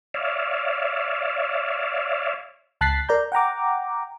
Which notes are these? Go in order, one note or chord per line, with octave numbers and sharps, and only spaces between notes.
C#5 D5 E5 F5
C#2 A5 F#6 A6 B6 C7
A#4 D5 A#5 G6
F#5 G5 A#5 D6